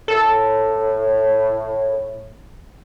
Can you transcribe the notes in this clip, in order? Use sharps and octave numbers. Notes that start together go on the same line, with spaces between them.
A2 A4